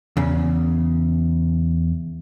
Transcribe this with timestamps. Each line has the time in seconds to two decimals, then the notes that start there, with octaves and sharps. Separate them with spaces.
0.17 E2 C#3